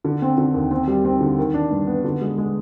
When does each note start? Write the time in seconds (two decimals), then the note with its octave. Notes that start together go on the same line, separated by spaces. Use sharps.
0.04 D3
0.22 C4
0.38 D3
0.54 D#2
0.71 C4
0.87 G3
1.05 C4
1.21 D3
1.38 D#3
1.54 D4
1.71 G2
1.87 B3
2.05 D3
2.22 G#3
2.38 G#3